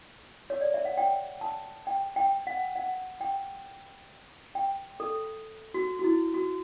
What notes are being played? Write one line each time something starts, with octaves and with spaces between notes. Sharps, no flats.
C#5
D5
E5
F#5
G5
A5
G5
G5
F#5
F#5
G5
G5
A4
F#4
F#4
E4
F#4